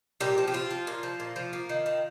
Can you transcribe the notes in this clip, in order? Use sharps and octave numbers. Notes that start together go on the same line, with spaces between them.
A#2 G3 G4
F3
G4
C4 F4
F3
A#2
F3
A#2
F3
A#3
D#3
D#3